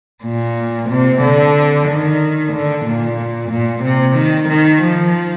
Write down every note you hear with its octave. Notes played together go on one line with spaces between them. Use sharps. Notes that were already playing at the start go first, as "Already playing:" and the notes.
A#2
C3
D3
D#3
D3
A#2
A#2
C3
D#3
D#3
F3